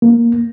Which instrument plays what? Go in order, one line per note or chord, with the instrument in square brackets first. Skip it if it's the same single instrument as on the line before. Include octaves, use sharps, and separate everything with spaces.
[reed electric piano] A#3